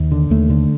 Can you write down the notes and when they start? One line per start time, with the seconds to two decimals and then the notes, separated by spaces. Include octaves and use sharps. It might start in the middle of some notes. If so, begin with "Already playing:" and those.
Already playing: D#2
0.12 D3
0.30 D#2 A3
0.50 D3